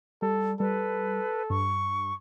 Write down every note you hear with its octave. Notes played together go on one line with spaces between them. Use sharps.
G3 A4
G3 A4 B4
G2 C#6